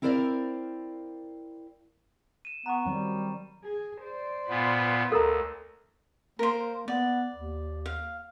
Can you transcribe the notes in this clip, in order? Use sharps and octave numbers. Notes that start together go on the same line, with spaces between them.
C4 E4 A#4 C5 D5 F5
D#7 E7
B3 A#5 C#6
D#3 F#3 G3 C4
G#4
C5 D5
A#2 B3 F4 B4
D2 A4 A#4 A#5
A#3 A#4 C5
B3 D5
D#2
F5